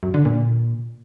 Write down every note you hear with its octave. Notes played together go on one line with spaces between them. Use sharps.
F#2
D3
A#2